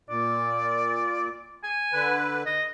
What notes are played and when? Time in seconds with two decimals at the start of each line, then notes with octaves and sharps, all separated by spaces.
0.09 A#2 D5
1.64 G#5
1.92 D3 B4
2.46 D#5